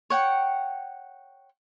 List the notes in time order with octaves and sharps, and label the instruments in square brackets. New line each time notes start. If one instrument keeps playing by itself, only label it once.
[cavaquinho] C#5 F#5 G5